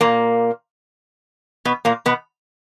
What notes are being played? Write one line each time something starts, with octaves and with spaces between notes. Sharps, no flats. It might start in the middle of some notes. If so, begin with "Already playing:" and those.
A#2 A#3
B2 B3
A#2 A#3
B2 B3